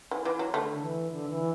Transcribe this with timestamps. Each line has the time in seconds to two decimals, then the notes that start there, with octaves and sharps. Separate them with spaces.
0.11 E3
0.25 E3
0.39 F#3
0.53 D3 A3
0.82 E3
1.11 D3
1.29 E3